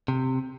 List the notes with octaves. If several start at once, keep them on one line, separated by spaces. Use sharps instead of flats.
C3